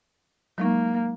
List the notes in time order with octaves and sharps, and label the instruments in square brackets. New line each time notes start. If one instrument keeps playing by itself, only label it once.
[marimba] F#3 G#3 D#4 [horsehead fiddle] A#3